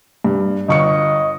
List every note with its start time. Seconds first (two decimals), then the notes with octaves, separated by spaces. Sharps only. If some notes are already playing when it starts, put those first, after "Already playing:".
0.24 G2
0.69 G1 D#5 C#6 C#7